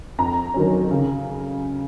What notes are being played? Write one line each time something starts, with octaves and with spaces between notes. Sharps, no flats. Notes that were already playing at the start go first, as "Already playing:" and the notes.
F2 A#5
D#3 F#3 C#4
C#3